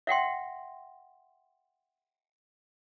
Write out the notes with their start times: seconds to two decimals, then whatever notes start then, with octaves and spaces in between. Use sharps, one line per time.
0.07 E5 F#5 G5 C6